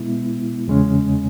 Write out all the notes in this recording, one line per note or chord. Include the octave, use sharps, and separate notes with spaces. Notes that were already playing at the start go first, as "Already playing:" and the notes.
Already playing: B2 G#3 B3 E4
E2 C#3 G#3 C#4